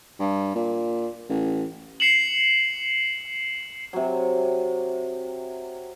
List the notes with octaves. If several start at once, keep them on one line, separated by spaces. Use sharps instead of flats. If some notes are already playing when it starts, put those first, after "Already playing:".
G2
A#2
A1
C7 C#7 E7 F#7
C3 F#3